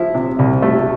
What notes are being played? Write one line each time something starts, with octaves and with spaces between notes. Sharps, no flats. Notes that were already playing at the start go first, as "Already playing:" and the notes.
Already playing: F3 E4
C3
C2
A3